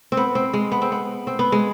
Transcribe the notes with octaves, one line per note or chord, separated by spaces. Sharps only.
C4
B3
C4
G#3
B3
C4
B3
C4
B3
G#3